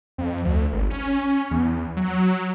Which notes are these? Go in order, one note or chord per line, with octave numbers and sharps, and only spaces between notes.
F2
D2
G#1
C#4
E2
F#3